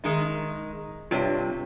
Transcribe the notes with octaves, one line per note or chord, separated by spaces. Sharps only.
D#3 G#3 D#4
G2 C3 F4 C#5